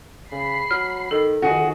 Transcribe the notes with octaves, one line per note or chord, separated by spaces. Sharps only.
C#3 B5 C7
F#3 F6
D#3 A4
F2 D#3 F#4 G#4